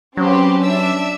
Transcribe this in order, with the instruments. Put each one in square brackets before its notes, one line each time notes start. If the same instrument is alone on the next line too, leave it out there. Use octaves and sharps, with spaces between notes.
[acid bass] F#3 [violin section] C4 G4 B4 [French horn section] C#4
[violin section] D4 E5 E6